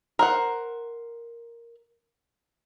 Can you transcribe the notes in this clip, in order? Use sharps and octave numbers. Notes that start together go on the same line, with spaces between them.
A#4 C5 F#5